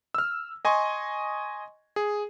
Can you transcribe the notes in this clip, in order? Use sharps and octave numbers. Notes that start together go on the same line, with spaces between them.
E6 F6
D#5 G#5 C6 C#6
G#4